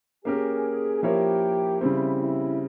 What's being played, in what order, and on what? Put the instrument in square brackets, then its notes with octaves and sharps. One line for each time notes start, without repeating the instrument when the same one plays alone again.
[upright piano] A#3 C#4 G4 A#4 [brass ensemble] G#4
[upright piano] F3 A#3 E4 A#4 C#5 [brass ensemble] G4
[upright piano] C#3 G3 C4 [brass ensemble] E4
[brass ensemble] E4